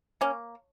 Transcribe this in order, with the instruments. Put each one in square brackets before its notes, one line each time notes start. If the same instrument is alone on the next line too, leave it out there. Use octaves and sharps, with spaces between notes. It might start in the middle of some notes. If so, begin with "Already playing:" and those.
[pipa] A#3 C#4